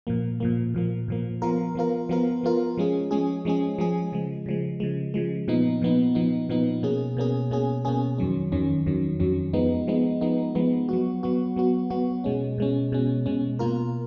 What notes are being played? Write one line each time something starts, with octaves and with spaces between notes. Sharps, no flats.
A#2 F3 A#3
A#2 F3 A#3
A#2 F3 A#3
A#2 F3 A#3
F3 B3 F4 A#4
F3 B3 F4 A#4
F3 B3 F4 A#4
F3 B3 F4 A#4
F3 G#3 C#4 G#4
F3 G#3 C#4 G#4
F3 G#3 C#4 G#4
F3 G#3 C#4 G#4
C#3 F3 G#3
C#3 F3 G#3
C#3 F3 G#3
C#3 F3 G#3
A#2 F3 B3 D#4
A#2 F3 B3 D#4
A#2 F3 B3 D#4
A#2 F3 B3 D#4
B2 A#3 C#4 G#4
B2 A#3 C#4 G#4
B2 A#3 C#4 G#4
B2 A#3 C#4 G#4
F2 D#3 F#3 C#4
F2 D#3 F#3 C#4
F2 D#3 F#3 C#4
F2 D#3 F#3 C#4
F3 G#3 B3 D#4
F3 G#3 B3 D#4
F3 G#3 B3 D#4
F3 G#3 B3 D#4
F#3 B3 F#4
F#3 B3 F#4
F#3 B3 F#4
F#3 B3 F#4
B2 G#3 C#4
B2 G#3 C#4
B2 G#3 C#4
B2 G#3 C#4
B2 A#3 F4 A#4